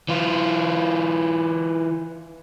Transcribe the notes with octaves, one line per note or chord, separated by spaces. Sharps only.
E3 F4